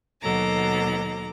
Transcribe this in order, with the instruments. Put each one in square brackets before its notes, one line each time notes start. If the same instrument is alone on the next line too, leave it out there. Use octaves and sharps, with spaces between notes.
[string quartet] D#2 B2 F#3 A4 A#5 D6